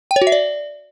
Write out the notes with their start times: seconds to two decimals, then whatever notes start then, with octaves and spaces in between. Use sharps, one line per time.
0.11 G5
0.16 C#5
0.21 F#4
0.27 E5
0.32 D5